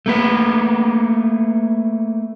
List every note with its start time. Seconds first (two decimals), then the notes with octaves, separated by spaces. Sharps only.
0.06 A3 A#3 B4